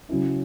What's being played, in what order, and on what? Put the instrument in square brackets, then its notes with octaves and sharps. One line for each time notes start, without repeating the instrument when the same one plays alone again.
[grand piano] C#3 F#3 C#4 E4